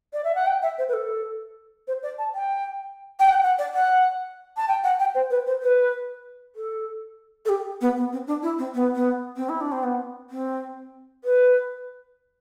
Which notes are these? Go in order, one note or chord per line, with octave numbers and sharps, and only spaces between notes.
D5
E5
F#5
G5
E5
C5
B4
A4
C5
D5
A5
G5
G5
F#5
F#5
D5
F#5
A5
G5
F#5
G5
C5
B4
C5
B4
A4
A4
G4
B3
B3
C4
D4
E4
C4
B3
B3
C4
E4
D4
C4
B3
C4
B4